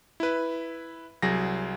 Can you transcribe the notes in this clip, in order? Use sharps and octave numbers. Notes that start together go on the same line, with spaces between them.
E4 B4
C2 F#3 G#4 A#6